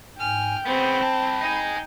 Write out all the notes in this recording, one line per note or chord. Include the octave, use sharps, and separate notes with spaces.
G#2 G5 G#5 F6
C#3 B3 C4 B5
C2 A5
D#4 D#5 G#5